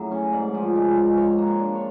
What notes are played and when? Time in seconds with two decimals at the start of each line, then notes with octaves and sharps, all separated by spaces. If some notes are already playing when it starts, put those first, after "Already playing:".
Already playing: A2 C#3 F#3
0.11 C#4
0.32 G#2 D5
0.55 F3
0.75 G#3
0.96 G#3
1.17 F4 C#5
1.38 A#3
1.60 D4
1.75 C#5